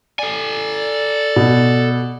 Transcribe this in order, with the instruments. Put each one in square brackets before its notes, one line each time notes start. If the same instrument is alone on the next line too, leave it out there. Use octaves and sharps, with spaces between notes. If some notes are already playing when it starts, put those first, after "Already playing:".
[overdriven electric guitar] A4 G#5 [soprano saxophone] D5
[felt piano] B2